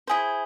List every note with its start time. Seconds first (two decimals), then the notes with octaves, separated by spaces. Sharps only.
0.07 E4 G#4 C5